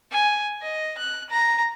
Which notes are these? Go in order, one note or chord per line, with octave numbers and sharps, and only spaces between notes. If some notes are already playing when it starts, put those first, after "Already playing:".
G#5
D#5
F#6
A#5